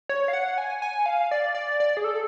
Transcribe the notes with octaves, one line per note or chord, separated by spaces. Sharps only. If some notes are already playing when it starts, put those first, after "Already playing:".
C#5
F5
F#5
G#5
G#5
F5
D5
D5
D5
G#4
A4